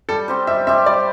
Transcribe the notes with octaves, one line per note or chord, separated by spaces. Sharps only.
G3 A4
C4 G4 C5
G3 E5
C4 G4 C5 E5
G3 D5